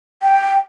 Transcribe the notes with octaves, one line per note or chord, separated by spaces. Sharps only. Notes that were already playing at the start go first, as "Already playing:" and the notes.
G5